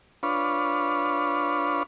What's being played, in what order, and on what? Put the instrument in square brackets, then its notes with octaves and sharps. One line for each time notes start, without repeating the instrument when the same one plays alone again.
[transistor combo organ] D4 F4 B4 C#5